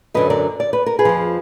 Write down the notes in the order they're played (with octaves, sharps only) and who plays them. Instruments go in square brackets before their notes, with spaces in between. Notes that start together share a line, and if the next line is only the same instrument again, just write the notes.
[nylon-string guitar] F#2 D3 F#3 B4 D#5
A#4 D5
D5
B4
A#4
G#4 B4
F2 F3